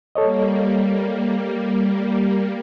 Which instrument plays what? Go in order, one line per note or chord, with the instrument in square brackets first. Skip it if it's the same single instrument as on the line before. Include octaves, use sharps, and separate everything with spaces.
[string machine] G3 A#3 [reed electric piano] A4 C#5 D#5